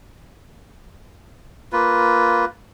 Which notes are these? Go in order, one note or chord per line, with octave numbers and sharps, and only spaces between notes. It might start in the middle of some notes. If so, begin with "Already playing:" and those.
A#3 F4 B4